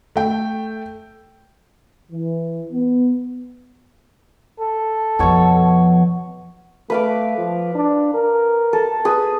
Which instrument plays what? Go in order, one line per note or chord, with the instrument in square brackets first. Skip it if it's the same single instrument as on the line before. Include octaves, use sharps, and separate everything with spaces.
[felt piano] A3 G5
[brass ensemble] E3
B3
[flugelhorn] A4
[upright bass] F2 F3 [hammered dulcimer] B2 C#5 A5
[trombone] A3 [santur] B4 F5 D6
[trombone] F3
D4
A#4
[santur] A4
G#4 B4